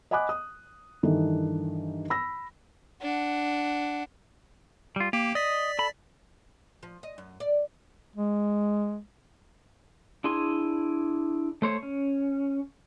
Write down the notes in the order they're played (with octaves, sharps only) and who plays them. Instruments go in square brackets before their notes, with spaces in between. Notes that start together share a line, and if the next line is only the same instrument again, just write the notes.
[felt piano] D#5 F#5 G#5 B5 D6 F#6
D#6
G2 D#3 E3 D4 D#4 A4
B5 E6 A#6
[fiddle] D4 F#5
[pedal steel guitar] G3 F4
[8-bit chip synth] A#3 [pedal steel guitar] G4
[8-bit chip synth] D5 B6 [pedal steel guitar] D#5
[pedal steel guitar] A4 B5
[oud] F3
D#5
F#2
D5
[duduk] G#3
[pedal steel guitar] D4 E4 G#4 G#5 C6
A3 C5 C#5
C#4